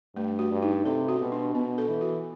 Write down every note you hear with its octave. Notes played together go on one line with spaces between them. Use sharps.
G2 A3
F#4
G2
D#4
C3 A4
F#4
B2
D4
B2 B3
A4
E3
F#4